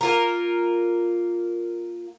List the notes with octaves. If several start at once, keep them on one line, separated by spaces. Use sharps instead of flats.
A#3 F4 A#4